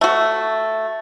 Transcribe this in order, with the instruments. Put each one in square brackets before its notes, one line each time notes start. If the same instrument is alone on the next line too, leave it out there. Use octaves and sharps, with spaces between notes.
[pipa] A3 F#4